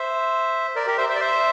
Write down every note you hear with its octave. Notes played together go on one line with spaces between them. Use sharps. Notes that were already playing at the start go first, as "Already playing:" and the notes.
Already playing: C5 E5
A#4 D5
G4 A#4
C5 E5
C5 E5
D5
C5 E5